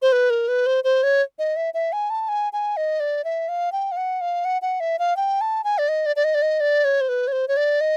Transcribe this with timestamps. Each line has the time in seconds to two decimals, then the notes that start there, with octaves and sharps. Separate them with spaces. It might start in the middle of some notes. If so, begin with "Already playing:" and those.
0.02 C5
0.12 B4
0.30 A#4
0.48 B4
0.66 C5
0.84 C5
1.03 C#5
1.39 D#5
1.56 E5
1.74 E5
1.93 G#5
2.10 A5
2.29 G#5
2.53 G#5
2.77 D#5
3.00 D5
3.24 E5
3.49 F5
3.72 G5
3.92 F5
3.97 F#5
4.21 F5
4.45 F#5
4.62 F#5
4.80 E5
4.99 F5
5.17 G5
5.41 A5
5.64 G#5
5.78 D5
5.89 D#5
6.06 D5
6.16 D5
6.24 D#5
6.35 D5
6.42 D#5
6.60 D5
6.85 C#5
7.01 C5
7.09 B4
7.28 C#5
7.32 C5
7.48 C#5
7.57 D5
7.81 D#5